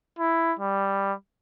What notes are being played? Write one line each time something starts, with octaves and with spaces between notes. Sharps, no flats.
E4
G3